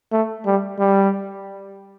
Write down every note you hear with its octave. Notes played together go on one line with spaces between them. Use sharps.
A3
G3
G3